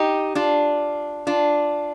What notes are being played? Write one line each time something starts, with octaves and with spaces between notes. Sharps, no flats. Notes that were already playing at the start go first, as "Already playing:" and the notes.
Already playing: D#4 G4
D4 F4
D4 F4